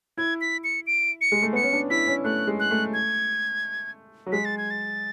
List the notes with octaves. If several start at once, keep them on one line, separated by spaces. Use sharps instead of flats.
E4 G#6
B6
C#7
D7
C#7
G#3
A3
B3 C#7
C#4
D4
E4 B6
C#4
A3 F#6
G#3
F#6
A3
G#6
F#3
G#3 B6
A6
G#6
A6